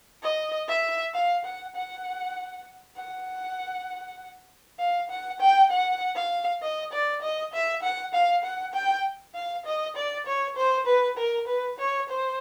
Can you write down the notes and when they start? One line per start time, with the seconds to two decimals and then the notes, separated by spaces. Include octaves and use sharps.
0.23 D#5
0.68 E5
1.14 F5
1.45 F#5
1.75 F#5
2.97 F#5
4.79 F5
5.10 F#5
5.40 G5
5.71 F#5
6.16 F5
6.62 D#5
6.93 D5
7.22 D#5
7.53 E5
7.83 F#5
8.14 F5
8.44 F#5
8.74 G5
9.35 F5
9.66 D#5
9.96 D5
10.26 C#5
10.56 C5
10.86 B4
11.17 A#4
11.47 B4
11.79 C#5
12.09 C5